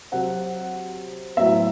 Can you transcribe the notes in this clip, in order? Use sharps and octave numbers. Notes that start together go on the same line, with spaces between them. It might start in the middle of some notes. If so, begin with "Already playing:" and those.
C3 F#3 C4 F#5
A2 F#3 B3 E5